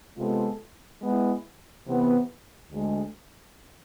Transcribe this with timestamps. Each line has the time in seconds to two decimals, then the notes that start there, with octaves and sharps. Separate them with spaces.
0.18 C3 G#3 B3 F4 A4
1.02 G#3 B3 E4
1.87 C3 E3 B3
2.72 D2 D3 G#3